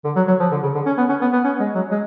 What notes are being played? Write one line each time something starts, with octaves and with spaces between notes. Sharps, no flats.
D3
F#3
F#3
F3
D3
C#3
D3
C#4
B3
C#4
B3
B3
C#4
G#3
F#3
G#3